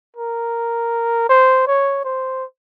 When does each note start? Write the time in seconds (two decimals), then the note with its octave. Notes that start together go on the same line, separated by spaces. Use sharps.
0.16 A#4
1.29 C5
1.67 C#5
2.05 C5